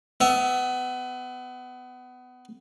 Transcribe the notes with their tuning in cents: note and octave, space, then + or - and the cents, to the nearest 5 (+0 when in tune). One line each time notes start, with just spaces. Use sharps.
B3 +25 E5 -5